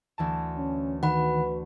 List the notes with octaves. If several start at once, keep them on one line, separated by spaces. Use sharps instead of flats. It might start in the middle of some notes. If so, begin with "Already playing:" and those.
D2 E3 A5
C#4
D#3 F#4 B4 F#5 B5